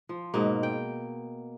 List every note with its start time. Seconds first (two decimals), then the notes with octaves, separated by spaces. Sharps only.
0.09 F3
0.34 G#2 B2 A#3
0.63 G5